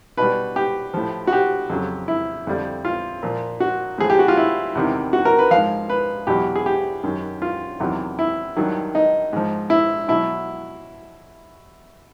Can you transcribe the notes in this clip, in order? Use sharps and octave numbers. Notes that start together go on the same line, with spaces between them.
B2 G3 B4
G4
A2 F3
F#4
G4
F2 C#3 F#3
E4
F2 D3 G3
F4
A#2 F3
F#4
A2 F3 G#4
G4
F#4
F4
E4
E2 C3 D#3
F#4
A#4
B4
G#2 F3 F5
B4
E2 B2 F#3 G4
G#4
G4
F#2 D#3 F#3
F4
E2 C3 D#3 F#3
E4
G2 D#3 F#3
D#4
G#2 F3
E4
B2 F#3 E4